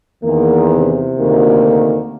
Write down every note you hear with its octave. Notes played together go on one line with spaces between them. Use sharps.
E2 D#3 A#3
C3
D2 D#3 A#3